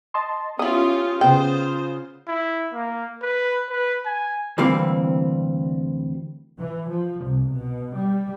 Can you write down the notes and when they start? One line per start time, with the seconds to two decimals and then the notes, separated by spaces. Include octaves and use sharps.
0.14 D#5 A5 C6
0.59 B3 C#4 E4 F4 G4 D#6
1.21 C#3 B3 F4 C5 G5
2.27 E4
2.73 A#3
3.22 B4
3.69 B4
4.06 G#5
4.58 D2 C3 E3 G3 A#3 C4
6.58 E3
6.90 F3
7.25 C2
7.54 B2
7.96 G3